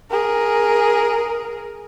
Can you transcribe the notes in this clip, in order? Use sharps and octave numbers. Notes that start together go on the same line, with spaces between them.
G#4 A#4